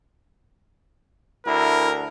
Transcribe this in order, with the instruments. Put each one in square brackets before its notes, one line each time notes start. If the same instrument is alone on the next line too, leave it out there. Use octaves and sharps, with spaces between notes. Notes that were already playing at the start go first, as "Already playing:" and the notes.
[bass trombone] D2 [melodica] E4 [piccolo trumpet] A#4